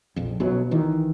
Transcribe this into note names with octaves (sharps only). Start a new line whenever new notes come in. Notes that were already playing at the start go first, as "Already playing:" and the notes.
A#1 F2
B1 B2 F#3
A1 D#3 E3